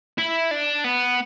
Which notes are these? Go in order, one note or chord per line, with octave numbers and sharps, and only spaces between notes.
E4
D4
B3